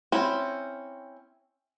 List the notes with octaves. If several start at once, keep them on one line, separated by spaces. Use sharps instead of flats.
C4 C#4 E4